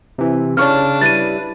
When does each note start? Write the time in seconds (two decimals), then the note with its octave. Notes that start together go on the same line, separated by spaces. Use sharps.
0.18 C3 E3
0.57 C#3 D4 C#5 C#6 F6
1.01 G3 E4 B4 A6 D#7